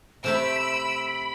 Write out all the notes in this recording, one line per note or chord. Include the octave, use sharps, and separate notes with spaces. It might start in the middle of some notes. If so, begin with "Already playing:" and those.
C3 A3 C4 B5 E6 D7